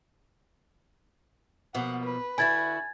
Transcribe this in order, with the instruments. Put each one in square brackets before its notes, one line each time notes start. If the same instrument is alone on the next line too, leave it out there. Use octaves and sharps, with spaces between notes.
[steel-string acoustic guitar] B2 F3 A#3 [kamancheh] F#5
[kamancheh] B4
[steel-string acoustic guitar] D3 E4 F#4 [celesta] G#5 G#6 A6